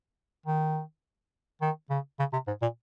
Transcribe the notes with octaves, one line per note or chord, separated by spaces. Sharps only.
D#3
D#3
C#3
C#3
C3
G#2
A#2